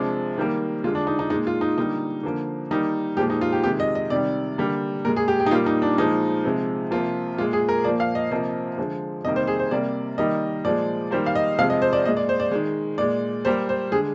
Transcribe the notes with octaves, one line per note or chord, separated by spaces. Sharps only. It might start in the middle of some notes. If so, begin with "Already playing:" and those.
Already playing: C3 F3 G#3 D4
D#3 G3 A#3
D3 G#3 F4
D4
D#4
D#4
A#2 G#3 D#4
F4
D#4
D3 G3 A#3 D#4
D3 F3 A#3
D#3 G3 A#3 D#4
A#2 F3 G#3 G4
D#4
F4
G4
C3 D#3 G#3 G4
D#5
D#5
C3 D#3 G3 D5
D3 G3 A#3
A#2 G#3 A#4
G#4
G4
G4
D#4
A#2 G3 A#3 F4
D#4
D4
A#2 F3 G#3 D#4
C3 F3 G#3
C3 F3 A#3 F4
A#2 G#3 F4
G#4
A#4
A#2 F3 A#3 D5
F5
D#5
C3 F3 A#3 D#5
D3 F3 G#3
C3 D#3 G3 A#3 D#5
C5
G#4
C5
C3 G3 A#3 D5
D#3 G3 A#3 D#5
A#2 F3 G#3 D5
D#3 G3 A#3 C5
F5
D#5
C3 F3 G#3 F5
D#5
C5
D5
A#2 G#3 D#5
D5
C5
D5
D#3 G#3
A#2 G#3 D5
A#2 G3 A#3 C5
C5
D3 G#3 G#4